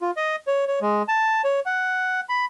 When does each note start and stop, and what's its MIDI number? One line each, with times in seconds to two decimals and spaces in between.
0.02 0.11 65
0.17 0.36 75
0.47 0.65 73
0.68 0.79 73
0.81 1.03 56
1.08 1.42 81
1.44 1.60 73
1.66 2.21 78
2.29 2.45 83